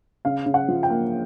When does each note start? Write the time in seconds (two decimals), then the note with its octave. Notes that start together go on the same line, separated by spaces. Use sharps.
0.25 C#3 F5
0.46 C#3
0.54 F#5
0.68 F3
0.83 G5
0.90 A#3